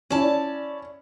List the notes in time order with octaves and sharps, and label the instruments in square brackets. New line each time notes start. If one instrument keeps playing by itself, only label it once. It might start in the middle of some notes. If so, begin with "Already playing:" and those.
[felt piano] C#4 E4 [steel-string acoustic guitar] D5 A5